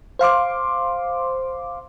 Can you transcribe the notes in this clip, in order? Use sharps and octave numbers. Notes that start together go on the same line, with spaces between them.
C5 F5 C6 D6